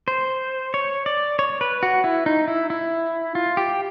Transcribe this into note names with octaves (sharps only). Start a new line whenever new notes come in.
C5
C#5
D5
C#5
B4
F#4
E4
D#4
E4
E4
F4
G4